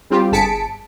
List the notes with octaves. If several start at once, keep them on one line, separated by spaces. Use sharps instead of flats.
G3 C4 F4 G4
G1 G#4 A5 B6 C#7 D7